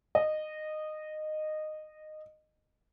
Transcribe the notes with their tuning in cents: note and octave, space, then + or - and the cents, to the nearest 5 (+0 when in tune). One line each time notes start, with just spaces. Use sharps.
D#5 -15